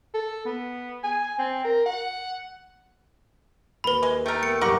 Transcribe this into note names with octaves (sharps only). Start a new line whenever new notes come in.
A4
B3
G#5
C4
A#4
F#5
D#2 B4 B5
G#3
A3 A4 A#4 G5
B3 C#7
C2 G2 F#3 G4 A#4 F#5 C#6